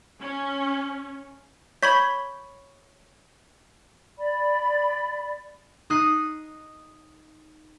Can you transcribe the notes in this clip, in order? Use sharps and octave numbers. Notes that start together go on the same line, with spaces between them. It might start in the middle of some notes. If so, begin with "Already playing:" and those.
C#4
C#5 B5 C#6 G#6 B6
D5 B5
D#4 D#6 F#6 C7